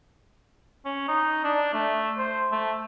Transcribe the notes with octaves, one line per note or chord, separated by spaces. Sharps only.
C#4
D#4
D4
A3
C5
A3